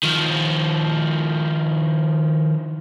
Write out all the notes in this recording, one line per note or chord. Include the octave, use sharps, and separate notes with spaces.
D#3 F3